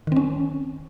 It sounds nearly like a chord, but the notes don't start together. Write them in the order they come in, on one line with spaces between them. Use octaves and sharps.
D#3 C4 C#4